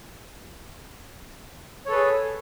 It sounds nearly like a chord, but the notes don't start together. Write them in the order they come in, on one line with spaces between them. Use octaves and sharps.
C#5 A4 B4 G#4